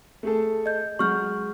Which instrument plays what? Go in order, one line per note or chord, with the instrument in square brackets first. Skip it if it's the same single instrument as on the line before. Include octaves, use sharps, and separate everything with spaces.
[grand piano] A3 G#4 A4
[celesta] D#5 G6
[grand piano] F#3 G#3 [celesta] C#6 F6 G6